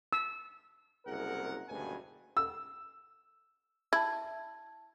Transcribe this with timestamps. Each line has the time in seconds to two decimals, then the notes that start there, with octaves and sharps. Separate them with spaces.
0.13 E6
1.06 F#1 C2 G#4 A#4 F#5
1.69 F#1 D2 G2 B2 G#5
2.37 E6
3.93 E4 A5 G#6